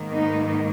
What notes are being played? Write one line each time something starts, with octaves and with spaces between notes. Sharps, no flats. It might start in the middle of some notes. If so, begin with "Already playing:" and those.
Already playing: G#2 D#3 A#3
B3 D#4